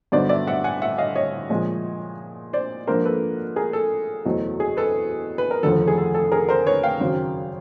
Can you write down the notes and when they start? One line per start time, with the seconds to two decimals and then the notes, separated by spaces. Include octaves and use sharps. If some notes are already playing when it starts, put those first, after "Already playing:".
0.12 G2 D3 F#3 B3 D#4 C5 D5
0.29 D5 E5
0.47 E5 F#5
0.64 F#5 G#5
0.82 E5 F#5
0.98 D#5 F5
1.16 C#5 D#5
1.50 A#2 F3 G#3
2.53 C5 D5
2.87 G#2 F3 A#3 D4 F4 A#4 C5
3.05 A4 B4
3.56 G#4 A#4
3.73 A4
4.25 F#1 E2 B2 F#3 A3
4.60 G#4
4.77 A4 B4
5.38 B4
5.51 A#4
5.63 F1 D#2 D3 F3 A4
5.88 G#4
5.98 A4
6.15 A4
6.32 G#4 A#4
6.49 A#4 C5
6.66 B4 C#5
6.83 F5 G5
7.00 G#1 F#2 C#3 F#3